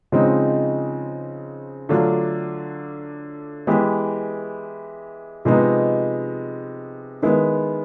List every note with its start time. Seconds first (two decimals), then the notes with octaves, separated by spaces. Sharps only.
0.12 C#3 F3 G#3 C4 D#4
1.89 D3 F#3 A3 D4 F4
3.67 E3 G#3 B3 E4 G4
5.45 C3 F3 G#3 B3 D#4
7.22 D#3 G#3 B3 E4